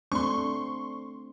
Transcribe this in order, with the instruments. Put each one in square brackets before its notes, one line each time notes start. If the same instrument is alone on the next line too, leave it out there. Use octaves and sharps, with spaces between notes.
[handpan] A3 C4 D4 [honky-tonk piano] C6 C#6